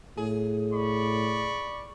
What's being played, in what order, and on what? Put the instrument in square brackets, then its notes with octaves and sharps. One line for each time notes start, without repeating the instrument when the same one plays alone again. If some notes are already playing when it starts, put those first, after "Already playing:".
[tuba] A2 [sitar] G#4
[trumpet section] D5 B5 C#6